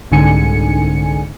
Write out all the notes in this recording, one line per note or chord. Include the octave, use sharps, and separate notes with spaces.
C2 G#2 D3 G#5 C#7